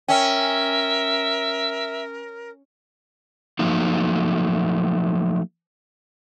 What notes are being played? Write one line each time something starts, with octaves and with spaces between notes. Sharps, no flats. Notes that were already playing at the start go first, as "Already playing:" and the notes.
C#4 A#4 E5 G5
F3 F#3 A3 A#3 D#4